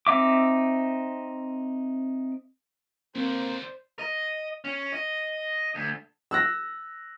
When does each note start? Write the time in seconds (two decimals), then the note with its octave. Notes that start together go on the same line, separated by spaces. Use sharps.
0.07 C4 D#4 E5 D6
3.16 D#2 D3 A#3 C4 C5
3.99 D#5
4.65 C#4
4.93 D#5
5.75 D2
6.31 E6 F#6 A#6